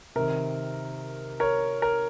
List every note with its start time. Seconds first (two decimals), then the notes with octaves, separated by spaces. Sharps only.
0.15 C3 D#3 A#4
1.40 A#4 C#5
1.82 A#4